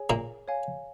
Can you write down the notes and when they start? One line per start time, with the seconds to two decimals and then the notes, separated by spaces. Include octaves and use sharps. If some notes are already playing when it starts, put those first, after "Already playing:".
Already playing: G#4 C#5 G#5
0.10 A#2 A#3
0.48 C#5 F5 G#5